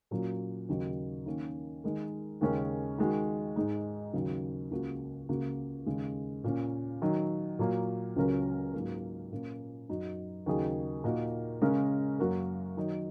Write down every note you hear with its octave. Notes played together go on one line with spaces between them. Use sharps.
A#2 F#3 A#3 C#4
D#2 C#3 F#3 D#4
D#3 A#3 C#4
D#3 G#3 D#4 A#4
D#2 C#3 G#3 C#4 A#4
D#3 G#3 F#4
G#2 G#3 D#4
D#2 C#3 F#3
C#2 C#3 A#3 F#4
C#2 C#3 A#3 F#4
D#2 C#3 G#3
A#2 A#3 C#4
D#3 F#3 D#4
A#2 F#3 A#3
C#2 C#3 F#3 C#4 A#4
G#2 F#3 A#3
A#2 A#3 C#4
F#2 F#3 D#4 F#4
D#2 C#3 F#3 D#4 G#4
A#2 A#3 D#4 F#4 A#4
C#3 G#3 C#4 A#4
F#2 F#3 A#3 F#4 A#4
D#3 F#3 D#4